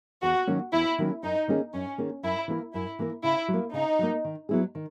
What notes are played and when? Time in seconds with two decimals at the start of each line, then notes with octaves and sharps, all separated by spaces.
0.22 E2 F#4
0.47 D#3 F#3 A#3 C#4
0.72 E2 E4
0.98 D#3 F#3 A#3 C#4
1.23 F#2 D#4
1.48 D#3 A#3 C#4 G#4
1.73 F#2 C#4
1.98 D#3 A#3 C#4 G#4
2.23 F#2 E4
2.48 E3 A#3 E4 A#4
2.73 F#2 E4
2.99 E3 A#3 E4 A#4
3.24 C#3 E4
3.48 F#3
3.54 A#3
3.73 C#3 D#4
3.99 F#3 A#3
4.24 D#3
4.49 F#3 B3 E4 G#4
4.75 D#3